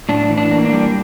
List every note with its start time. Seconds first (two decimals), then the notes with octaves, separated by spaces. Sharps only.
0.09 A2 D4
0.30 E3
0.38 D4
0.51 A#3
0.65 D4
0.73 G3